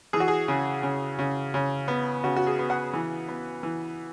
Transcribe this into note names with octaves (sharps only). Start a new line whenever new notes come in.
E3 G#4
F#4
G#4
C#3
C#3
C#3
C#3
B3
C#3 F#4
F#4
G#4
B3
F#5
E3
B3
E3